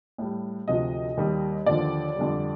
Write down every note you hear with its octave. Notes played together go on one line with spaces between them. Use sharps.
A2 G3
D2 C3 F3 D#5
D#2 D#3 G3
D#2 D3 F3 D5
F2 D3 G3